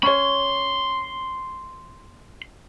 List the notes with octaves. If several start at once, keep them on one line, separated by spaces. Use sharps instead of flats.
C#4 C#5 B5 C6